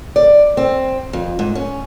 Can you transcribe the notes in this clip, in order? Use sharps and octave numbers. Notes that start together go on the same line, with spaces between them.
D5
C4
F2
G#2
C#4